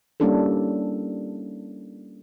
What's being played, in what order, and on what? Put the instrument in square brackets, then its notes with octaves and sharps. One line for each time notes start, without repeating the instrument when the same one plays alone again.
[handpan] G3 A#3 C#4 D4 E4 A4